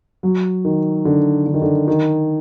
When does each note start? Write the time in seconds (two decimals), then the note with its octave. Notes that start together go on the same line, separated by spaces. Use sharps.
0.23 F#3
0.65 D#3
1.05 D3
1.46 D3
1.54 D#3
1.62 D3
1.88 D#3